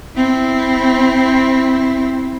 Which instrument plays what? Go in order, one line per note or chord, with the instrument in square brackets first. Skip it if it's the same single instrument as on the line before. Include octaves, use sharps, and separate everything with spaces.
[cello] C4 E4